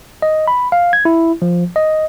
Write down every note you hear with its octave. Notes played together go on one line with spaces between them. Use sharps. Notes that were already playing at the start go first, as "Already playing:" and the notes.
D#5
B5
F5
G#6
E4
F3
D#5